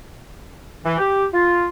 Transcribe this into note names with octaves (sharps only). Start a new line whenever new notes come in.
E3
G4
F4